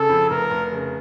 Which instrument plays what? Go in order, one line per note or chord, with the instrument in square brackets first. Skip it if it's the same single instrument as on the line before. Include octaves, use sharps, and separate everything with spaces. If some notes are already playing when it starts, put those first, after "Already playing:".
Already playing: [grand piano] C#3 [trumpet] A4
[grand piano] F2
[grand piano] F1 [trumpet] A#4
[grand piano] F1
C#3